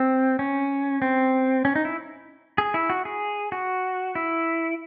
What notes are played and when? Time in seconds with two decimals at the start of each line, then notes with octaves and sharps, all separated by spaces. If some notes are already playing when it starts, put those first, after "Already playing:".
Already playing: C4
0.39 C#4
1.02 C4
1.65 C#4
1.75 D#4
1.85 E4
2.58 G#4
2.74 E4
2.90 F#4
3.05 G#4
3.52 F#4
4.15 E4